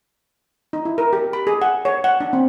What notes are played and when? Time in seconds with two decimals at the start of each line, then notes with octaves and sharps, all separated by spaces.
0.73 D#4
0.85 E4
0.98 A#4
1.13 G4
1.33 B5
1.47 G#4
1.62 F#5
1.85 C#5
2.04 F#5
2.20 D4
2.33 C4